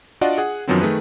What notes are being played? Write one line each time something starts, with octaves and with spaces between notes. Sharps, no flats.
D4 F4 F#4 D5 D#5 F#5
G#4 F#5
F#2 D#3 F3 F#3 B3 C4
D#3 A3 G#4 B4